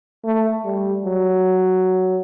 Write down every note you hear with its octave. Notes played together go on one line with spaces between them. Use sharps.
A3
G3
F#3